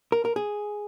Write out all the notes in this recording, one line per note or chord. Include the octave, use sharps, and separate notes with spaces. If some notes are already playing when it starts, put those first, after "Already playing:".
A#4
A#4
G#4